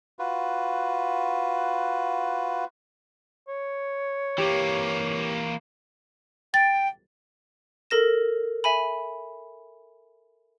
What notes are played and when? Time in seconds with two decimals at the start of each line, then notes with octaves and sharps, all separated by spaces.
0.19 F4 F#4 B4
3.48 C#5
4.38 E3 A#3 G4
6.54 G5 A6
7.90 A4 A#4 A#6 E7
8.64 E5 G#5 B5